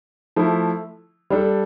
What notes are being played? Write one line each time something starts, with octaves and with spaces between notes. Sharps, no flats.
F3 A3 E4
G3 D4 A4